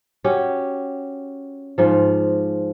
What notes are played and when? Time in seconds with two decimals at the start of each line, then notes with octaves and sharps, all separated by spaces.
0.24 C#4 F#4 G4
1.78 G#2 F3